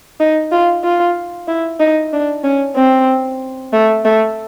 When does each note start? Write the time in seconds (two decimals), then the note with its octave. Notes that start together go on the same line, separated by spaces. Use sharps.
0.20 D#4
0.52 F4
0.84 F4
1.48 E4
1.80 D#4
2.13 D4
2.44 C#4
2.76 C4
3.73 A3
4.05 A3